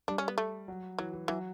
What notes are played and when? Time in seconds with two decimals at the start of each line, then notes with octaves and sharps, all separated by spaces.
0.08 G3 D4
0.18 C#4
0.28 B3
0.38 A3
0.68 F#3
0.99 E3 F#3
1.13 E3
1.28 E3 F#3